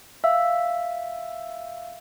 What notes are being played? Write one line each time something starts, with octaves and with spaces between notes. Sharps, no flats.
E5 F5 E6